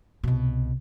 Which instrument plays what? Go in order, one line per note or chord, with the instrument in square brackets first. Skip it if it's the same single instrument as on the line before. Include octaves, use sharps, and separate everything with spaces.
[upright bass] C2 B2